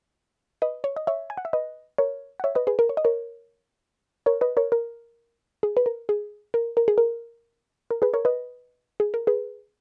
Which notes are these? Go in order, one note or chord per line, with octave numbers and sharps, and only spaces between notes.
B4 D#5
C#5
D#5
C#5 E5
G#5
F#5
E5
B4 D#5
A#4 C#5
F#5
C#5 E5
B4 D#5
G#4 B4
A#4
C#5
D#5
A#4 C#5
A#4 C#5
B4 D#5
A#4 C#5
A#4
G#4
B4
A#4
G#4
A#4
A#4
G#4
A#4
A#4
G#4 B4
A#4 C#5
B4 D#5
G#4
A#4
G#4 B4